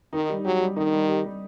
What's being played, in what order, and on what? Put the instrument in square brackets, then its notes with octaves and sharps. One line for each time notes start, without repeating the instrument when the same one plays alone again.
[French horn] D#3 [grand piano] D#4
[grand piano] G3
[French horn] F#3 [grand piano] G4
[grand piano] G3
[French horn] D#3 [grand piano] D#4
[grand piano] G3
G4
G3